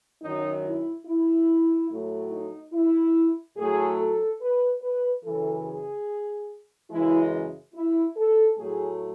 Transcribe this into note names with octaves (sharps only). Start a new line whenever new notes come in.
F#2 D#3 F#3 D#4
E4
E4
A2 F#3 A3
D#4
E4
A2 F#3 A3 G#4
A4
B4
B4
F#2 C#3 E3 A4
G#4
F#2 C#3 E3 G#3 E4
E4
A4
A2 F#3 A3 G#4